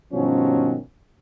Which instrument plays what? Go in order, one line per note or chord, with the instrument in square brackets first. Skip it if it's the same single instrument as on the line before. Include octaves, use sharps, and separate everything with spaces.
[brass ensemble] G2 B2 D#3 F3 F#3 C#4